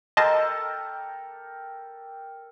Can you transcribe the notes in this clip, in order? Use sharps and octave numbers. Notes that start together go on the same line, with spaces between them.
G4 A4 A#4 D#5 A5 C6